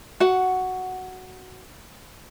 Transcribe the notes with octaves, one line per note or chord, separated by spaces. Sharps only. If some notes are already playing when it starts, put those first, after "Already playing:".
F#4 F#5